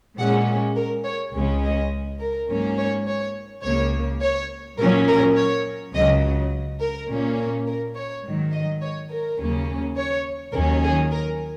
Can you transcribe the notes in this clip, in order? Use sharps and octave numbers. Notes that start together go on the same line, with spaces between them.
A#2 G#3 C#4 F#5
A#4
C#5
C#2 C#3 G#3 C#4
D#5
A#4
G#2 F#3 A#3 C#4
C#5
C#5
C#2 C#3 A#3 C#5
C#5
A#2 F#3 C#4 A#4
A#4
C#5
C#2 C#3 F#3 D#5
A#4
A#2 A#3 C#4
A#4
A#4
C#5
G#2 D#3 F#3
D#5
C#5
A#4
D#2 C#3 F#3 A#3 C#4
C#5
D#2 D#3 F#3 C#4 A#4
G#4
A#4